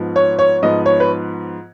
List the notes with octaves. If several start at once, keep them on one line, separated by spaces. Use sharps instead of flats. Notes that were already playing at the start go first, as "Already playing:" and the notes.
Already playing: G#2 F3 B3
C#5
C#5
G#2 F3 B3 D#5
C#5
B4